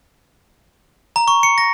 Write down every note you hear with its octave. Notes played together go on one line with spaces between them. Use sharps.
A#5
C#6
C#7
A#6